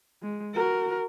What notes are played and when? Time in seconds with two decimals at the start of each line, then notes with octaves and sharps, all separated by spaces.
0.23 G#3
0.54 F#4 A#4